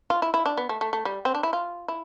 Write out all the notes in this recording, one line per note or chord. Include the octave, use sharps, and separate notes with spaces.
F4
E4
E4
D4
B3
A3
A3
A3
G3
C4
D4
E4
F4
E4